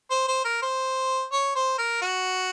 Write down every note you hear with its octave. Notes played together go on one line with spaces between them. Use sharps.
C5
C5
A#4
C5
C#5
C5
A#4
F#4